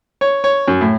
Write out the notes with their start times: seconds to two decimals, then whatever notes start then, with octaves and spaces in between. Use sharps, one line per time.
0.21 C#5
0.44 C#5
0.68 F#2
0.81 A2